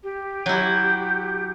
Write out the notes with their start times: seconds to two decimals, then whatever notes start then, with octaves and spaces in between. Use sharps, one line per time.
0.04 G4
0.46 F#3 E4 G6